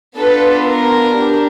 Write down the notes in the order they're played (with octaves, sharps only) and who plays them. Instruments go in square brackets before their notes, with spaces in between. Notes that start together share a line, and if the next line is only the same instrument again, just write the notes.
[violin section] B3 D4 F4 A4 B4
A#4
D4 G4